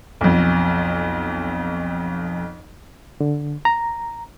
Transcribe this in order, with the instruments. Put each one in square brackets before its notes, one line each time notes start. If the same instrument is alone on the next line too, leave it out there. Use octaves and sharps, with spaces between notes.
[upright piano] B1 F2
[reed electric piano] D3
A#5